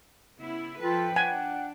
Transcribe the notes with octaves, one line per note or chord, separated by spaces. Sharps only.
C#3 B3 E4
F3 F4 A4 B4 G5
D4 F#5 G#5